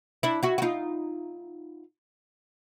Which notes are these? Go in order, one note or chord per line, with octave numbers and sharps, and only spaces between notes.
D4 E4
E4 F#4
F#4
D#4 F4